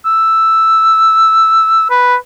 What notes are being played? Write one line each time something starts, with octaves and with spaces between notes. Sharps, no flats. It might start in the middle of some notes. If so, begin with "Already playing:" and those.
E6
B4